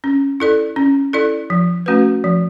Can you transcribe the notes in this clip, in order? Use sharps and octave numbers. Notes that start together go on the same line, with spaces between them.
C#4
E4 A4 D5
C#4
E4 A4 D5
F3
A3 C#4 F#4 B4
F3